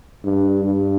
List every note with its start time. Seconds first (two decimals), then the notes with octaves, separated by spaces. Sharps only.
0.24 G2
0.65 G2